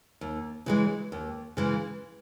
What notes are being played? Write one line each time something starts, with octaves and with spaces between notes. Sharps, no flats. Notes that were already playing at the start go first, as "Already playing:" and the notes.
D#2
C#3 E3 G#3
D#2
C#3 E3 G#3